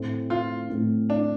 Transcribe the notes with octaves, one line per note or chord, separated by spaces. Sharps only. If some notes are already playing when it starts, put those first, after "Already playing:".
Already playing: A2 A3 C4
F4
A2 A3 C4
D4